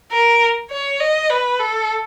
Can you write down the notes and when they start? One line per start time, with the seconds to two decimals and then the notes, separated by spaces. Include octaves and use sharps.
0.11 A#4
0.71 C#5
1.00 D#5
1.30 B4
1.60 A4